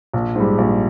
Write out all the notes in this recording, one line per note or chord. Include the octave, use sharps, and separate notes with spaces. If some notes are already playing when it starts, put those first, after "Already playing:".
A#1
G#2 G3
A#1